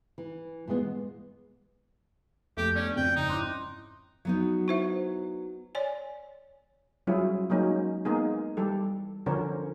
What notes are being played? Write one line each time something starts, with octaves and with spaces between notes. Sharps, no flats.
E3
A#2 E3 G#3 B3
F2 A3 G4
B3 C#4 D4 D5 G6
F2 G5 F#6
G#2 C#3 D#4
G#2 C#4 E4 C6 D6 F#6
F#3 B3 D#4
E4 C5 E5
C#5 D5 G#5
F#3 G3 C#4 E4 F4 G#4
F#3 G#3 A#3 C#4 D#4
G#3 A#3 B3 D#4 G#4
E3 G3 G4 A4
D3 F3 C#4 A#4 C5 C#5